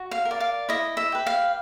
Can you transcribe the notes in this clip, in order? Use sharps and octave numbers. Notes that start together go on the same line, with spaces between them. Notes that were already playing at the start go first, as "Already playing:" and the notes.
Already playing: F#4
F5
A#4
D5
F5
E4 D#5
E5
G4 B4
F5